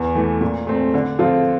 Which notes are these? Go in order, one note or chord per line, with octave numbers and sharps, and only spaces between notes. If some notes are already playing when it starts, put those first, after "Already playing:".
Already playing: E2
E3 A3
A#2
A3 C4
D3
F3 C4 F4 A4